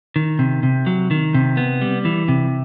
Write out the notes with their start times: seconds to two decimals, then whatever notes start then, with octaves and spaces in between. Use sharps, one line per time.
0.16 D#3
0.39 C3
0.63 C3
0.87 F#3
1.11 D#3
1.34 C3
1.57 B3
1.82 G3
2.05 E3
2.28 C3